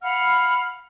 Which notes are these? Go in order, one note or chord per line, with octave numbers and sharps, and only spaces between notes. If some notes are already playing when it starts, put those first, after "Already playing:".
F5 F#5 B5 F6